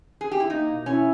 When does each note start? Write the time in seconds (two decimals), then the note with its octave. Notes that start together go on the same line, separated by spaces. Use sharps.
0.21 G#4
0.31 G4
0.40 E4
0.50 A#3 D#4
0.68 B2
0.86 C#4 E4